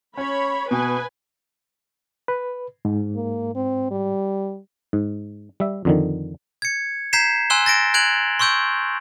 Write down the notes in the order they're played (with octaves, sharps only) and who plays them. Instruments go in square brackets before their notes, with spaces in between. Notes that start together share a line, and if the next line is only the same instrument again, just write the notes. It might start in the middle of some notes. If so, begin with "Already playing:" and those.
[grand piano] C#4 [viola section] C#5 B5
[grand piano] B2 [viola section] B4 G#5
[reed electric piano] B4
G#2
[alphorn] A#3
C4
G3
[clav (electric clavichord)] G#2
G3 E5
F2 D3 D#3
[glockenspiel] G#6 C#7
A#5 G6 G#6 B6 C7 E7
G#5 C6 E6 F#6 E7 G7
A6 A#6 D7
F#6 G#6 D7 F7 F#7
C6 C#6 E6 G6 D7